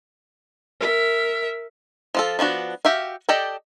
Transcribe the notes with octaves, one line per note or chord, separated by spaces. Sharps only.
A#4 E5
F3 F4 A4
F3 B3 D4 F#4
F#4 G4 E5 F5
G4 A4 D5 D#5 G5